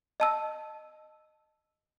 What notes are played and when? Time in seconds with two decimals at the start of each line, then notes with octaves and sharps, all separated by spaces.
0.20 D#5 A5 E6